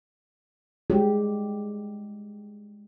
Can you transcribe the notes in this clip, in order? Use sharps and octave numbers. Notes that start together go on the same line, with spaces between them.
G#3 G4